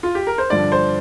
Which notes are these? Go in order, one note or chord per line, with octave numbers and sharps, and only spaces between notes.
F4
G4
A#4
C5
G2 D3 F3 D5
C5